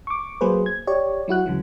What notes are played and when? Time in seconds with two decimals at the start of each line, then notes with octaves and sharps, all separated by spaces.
0.07 C#6 D6
0.41 F#3 A#3 G#4 B4 C5
0.66 G#6
0.87 G4 C#5 D5
1.28 F#3 E4 F#4 F#6
1.46 D2 C#3 E3 F#3